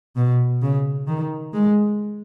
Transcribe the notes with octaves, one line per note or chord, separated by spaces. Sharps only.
B2
C#3
D#3
G#3